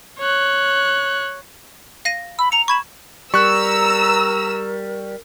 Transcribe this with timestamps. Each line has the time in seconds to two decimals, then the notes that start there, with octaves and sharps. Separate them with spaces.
0.19 C#5 F#6
2.05 F5 A#6 D#7
2.39 B5 E6
2.52 A#5 C#7 F7
2.68 B5 C#6 G#6 E7
3.34 G3 A#4 A#5 C#6 E6 F#6